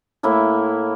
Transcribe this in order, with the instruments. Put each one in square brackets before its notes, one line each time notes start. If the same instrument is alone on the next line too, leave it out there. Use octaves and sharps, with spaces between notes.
[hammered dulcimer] A2 A#3 E4